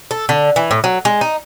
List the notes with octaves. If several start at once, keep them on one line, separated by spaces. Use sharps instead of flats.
A4
D3
E3
A2
F#3
G#3
D#4